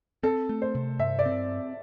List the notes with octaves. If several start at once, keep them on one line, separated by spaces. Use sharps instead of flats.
C4 A4
A3
C5
C3
G2 E5
D5
C4